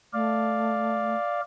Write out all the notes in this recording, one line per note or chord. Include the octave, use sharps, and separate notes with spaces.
A3 D5 F5